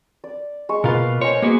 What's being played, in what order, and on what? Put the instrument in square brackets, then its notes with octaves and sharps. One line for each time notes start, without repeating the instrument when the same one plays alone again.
[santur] D5
G#3 C#6
[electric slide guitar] B2 F4 [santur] A#3 B4
[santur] C5 D#5 G#5 [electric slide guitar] C#5
[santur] G#3 [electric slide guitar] A#3 B3 F#4